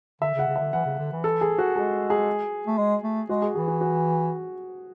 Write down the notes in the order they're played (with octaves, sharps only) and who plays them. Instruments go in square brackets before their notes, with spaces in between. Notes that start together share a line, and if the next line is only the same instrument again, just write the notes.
[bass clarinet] D3 [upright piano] E5
[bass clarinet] C#3
[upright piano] F#5
[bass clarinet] C#3
[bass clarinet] D3 [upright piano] E5
[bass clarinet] E3 [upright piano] F#5
[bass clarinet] C#3
D3
E3
[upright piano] A4
G#4
F#4
[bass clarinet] G#3 [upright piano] G#4
[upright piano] G#4
[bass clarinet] A3
G#3
A3
[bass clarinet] G#3 [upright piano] F#4
[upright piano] G#4
[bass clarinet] E3 [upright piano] G#4
[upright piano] F#4
F#4